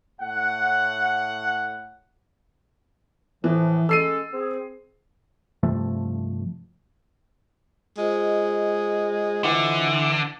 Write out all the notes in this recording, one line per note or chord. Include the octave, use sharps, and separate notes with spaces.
A2 F#5
A2 E3 F3
G#3 C#4 A4 E6 C7 D#7
C4 G#4
G2 C3 F3 A3
G#3 F4 C5 D#5
D3 E3